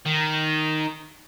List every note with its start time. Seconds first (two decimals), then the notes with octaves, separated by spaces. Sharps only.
0.06 D#3